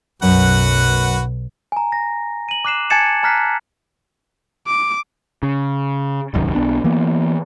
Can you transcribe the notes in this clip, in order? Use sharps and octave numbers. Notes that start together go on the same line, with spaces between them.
B1 F#2 F#4 B4 F#5
G#5 A#5
A#6
D#7 F#7
D6 F#6 C7 E7
G#5 A5 G#6 A6 C#7 E7
A5 A#5 F6 F#6 B6 C7
D6
C#3
D1 C2 F#2 D#3
B1 B3 D4
E3 A#3 B3